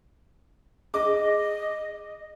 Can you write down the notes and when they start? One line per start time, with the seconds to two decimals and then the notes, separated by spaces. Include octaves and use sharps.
0.94 G#4 D#5 D6